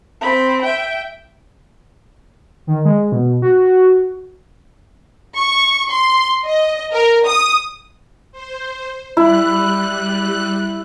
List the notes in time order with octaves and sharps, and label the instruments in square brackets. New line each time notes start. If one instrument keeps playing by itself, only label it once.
[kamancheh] C4 B5
E5 G5
[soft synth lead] D#3
G#3
B2
F#4
[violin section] C#6
C6
D#5
A#4
D#6
[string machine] C5
[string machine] G3 F#6 [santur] E4